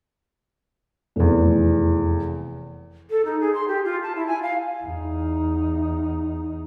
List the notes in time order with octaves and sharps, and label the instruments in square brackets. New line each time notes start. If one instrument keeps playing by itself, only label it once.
[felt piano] F1 E2
[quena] A4
D#4
G#4
C6
G4
F4
A5
E4
G#5
F5
[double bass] E2 D#4